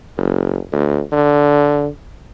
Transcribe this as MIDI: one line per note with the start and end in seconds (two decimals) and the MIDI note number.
0.17 0.59 30
0.73 1.01 38
1.12 1.87 50